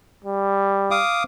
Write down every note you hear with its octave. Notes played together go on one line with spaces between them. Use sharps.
G3
F5 D6 D#6